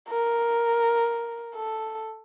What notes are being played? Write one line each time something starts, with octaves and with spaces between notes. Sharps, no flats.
A#4
A4